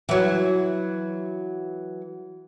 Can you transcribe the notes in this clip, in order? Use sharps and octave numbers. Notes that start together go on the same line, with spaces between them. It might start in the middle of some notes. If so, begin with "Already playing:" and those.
E3 F#3